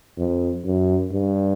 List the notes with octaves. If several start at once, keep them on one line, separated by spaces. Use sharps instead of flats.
F2
F#2
G2